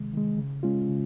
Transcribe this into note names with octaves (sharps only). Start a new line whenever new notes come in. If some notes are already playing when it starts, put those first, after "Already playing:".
Already playing: C3 D#3 G#3
D#3 G#3
C#3
G#3 C#4 F4
C#3